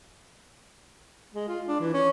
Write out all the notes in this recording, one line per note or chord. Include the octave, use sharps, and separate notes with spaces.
G#3
F4
D4
E3
C#4